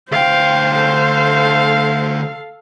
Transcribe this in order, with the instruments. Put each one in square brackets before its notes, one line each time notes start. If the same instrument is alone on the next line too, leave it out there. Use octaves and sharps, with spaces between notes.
[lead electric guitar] D2 G5 [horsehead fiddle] C5 [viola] F5
[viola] A4 F5